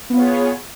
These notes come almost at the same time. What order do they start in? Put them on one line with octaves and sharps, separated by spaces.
B3 F4 C#5 G#4